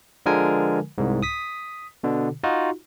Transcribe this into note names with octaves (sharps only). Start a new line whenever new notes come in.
D3 F3 G#3 A#4 G#5
C2 G#2
D#6 B6
B2 D3
D#4 F4 F#4